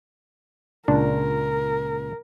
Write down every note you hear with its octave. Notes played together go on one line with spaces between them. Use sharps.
C#2 A#2 D4 A#4